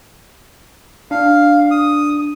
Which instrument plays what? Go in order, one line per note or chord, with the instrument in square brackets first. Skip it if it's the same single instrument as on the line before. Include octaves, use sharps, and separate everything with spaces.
[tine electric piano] D4 [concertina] F5
[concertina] D#6